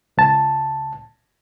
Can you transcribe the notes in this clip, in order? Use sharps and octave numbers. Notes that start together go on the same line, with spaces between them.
C#2 A5